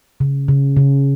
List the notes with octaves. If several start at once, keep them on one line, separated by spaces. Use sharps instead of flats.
C#3
C#3
C#3